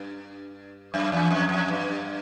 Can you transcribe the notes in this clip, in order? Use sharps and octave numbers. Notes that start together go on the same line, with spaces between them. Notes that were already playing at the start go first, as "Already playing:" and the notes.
Already playing: G2
F#2
E2
F2
F2
G2